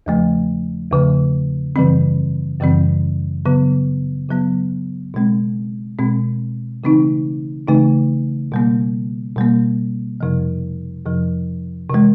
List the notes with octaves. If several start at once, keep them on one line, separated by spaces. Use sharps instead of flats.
E2 C#3 F3 A3
E2 C#3 F3 A3
F#2 C#3 E3 G3 C4
F#2 C#3 E3 G3 C4
C#3 F#3 B3
C#3 F#3 B3
B2 G#3 C4
B2 G#3 C4
C#3 E3 A3 C4 D#4
C#3 E3 A3 C4 D#4
B2 G3 A#3
B2 G3 A#3
F2 C3 F3
F2 C3 F3
C3 E3 G#3